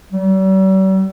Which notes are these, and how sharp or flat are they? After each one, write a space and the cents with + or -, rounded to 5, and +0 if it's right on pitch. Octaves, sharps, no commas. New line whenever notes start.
G3 -45